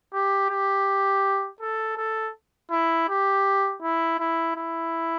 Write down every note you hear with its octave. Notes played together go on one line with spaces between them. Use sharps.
G4
G4
A4
A4
E4
G4
E4
E4
E4